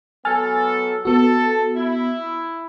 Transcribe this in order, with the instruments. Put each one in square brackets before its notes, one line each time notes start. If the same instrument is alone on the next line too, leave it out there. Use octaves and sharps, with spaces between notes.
[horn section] F#3 B3 A4 [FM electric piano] G#5 F6 A6
[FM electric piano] B3 F#4 [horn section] A4
[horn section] E4